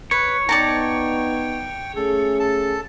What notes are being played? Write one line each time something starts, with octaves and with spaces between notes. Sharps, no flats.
B4 C#5
B3 D#4 D5 G5 A5 A#5
A3 C#4 G#4 A4
A4 A5